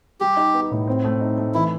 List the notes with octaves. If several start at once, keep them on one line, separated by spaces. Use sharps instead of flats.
G3 G4
D#4
B3
A2
C4
A3
D#4
A3
E3 E4